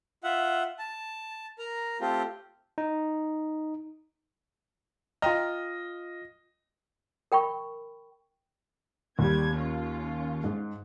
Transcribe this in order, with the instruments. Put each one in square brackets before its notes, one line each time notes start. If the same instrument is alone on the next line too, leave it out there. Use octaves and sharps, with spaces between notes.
[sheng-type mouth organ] F4 E5 F#5
A5
A#4 A#5
A3 C4 F4 G4
[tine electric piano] D#4
[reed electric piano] F4 F6 [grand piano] D#5 [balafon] G5 A#5
[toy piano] A#4 G5 B5 C#6
[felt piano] D#2 [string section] G3 G#6
[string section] C#4 F4
[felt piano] G#2